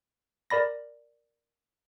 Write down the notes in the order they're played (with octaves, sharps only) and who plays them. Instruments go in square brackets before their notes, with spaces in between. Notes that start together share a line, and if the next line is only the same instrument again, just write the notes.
[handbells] A#4 D5 B5 A#6